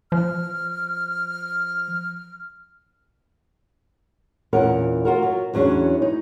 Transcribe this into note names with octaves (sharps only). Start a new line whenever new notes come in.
F3 F6
E2 A#2 C#4 A#4 F#5
F4 F#4 A#4
F#3
E2 F#3 C#4 D4 G#4
D#4